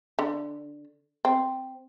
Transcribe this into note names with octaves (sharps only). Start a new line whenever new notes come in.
D3
C4